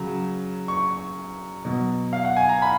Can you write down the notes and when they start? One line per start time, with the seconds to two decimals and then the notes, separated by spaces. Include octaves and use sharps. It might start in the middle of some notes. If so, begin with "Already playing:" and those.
Already playing: C#3 F#3
0.68 C#6
1.65 B2 F#3
2.13 F5
2.25 F#5
2.37 G#5
2.49 A#5
2.62 B5